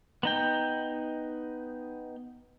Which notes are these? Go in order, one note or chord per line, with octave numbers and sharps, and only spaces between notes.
B3 D#4 G5